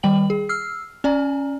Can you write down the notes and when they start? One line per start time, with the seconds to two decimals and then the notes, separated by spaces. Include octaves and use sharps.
0.03 D#3 G3 G5 F#7
0.30 G#4
0.49 E6 F6 C7
1.04 C#4 D5 G#5 A#5